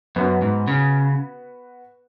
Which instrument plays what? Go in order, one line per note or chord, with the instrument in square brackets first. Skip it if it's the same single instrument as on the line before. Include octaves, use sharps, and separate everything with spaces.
[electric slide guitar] F#2 [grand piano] B3 F#4 B4
[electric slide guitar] G#2
C#3